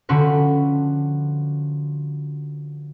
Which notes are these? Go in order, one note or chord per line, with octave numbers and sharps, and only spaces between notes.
D3 F3 C#4 F#4 B4